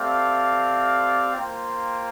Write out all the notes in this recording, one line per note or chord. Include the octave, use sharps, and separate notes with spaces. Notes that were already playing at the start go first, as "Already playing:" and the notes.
Already playing: A3 C4 G4 D5 F5
A#3 F4 C5 G5